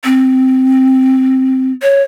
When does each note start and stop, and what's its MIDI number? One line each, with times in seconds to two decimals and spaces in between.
0.05 1.72 60
1.83 2.02 73